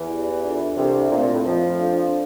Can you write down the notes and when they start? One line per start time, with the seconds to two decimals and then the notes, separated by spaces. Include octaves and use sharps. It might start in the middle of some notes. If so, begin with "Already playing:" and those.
Already playing: E2 E3
0.08 E4 G4 D5
0.43 D4 F4 A4
0.77 C2 C3 D4 A4 E5
1.11 A#2 A3 C4 F4 C5 F5
1.23 A#2
1.34 A2
1.45 F2 F3 F4 C5 E5
1.79 D4 A4 D5 F5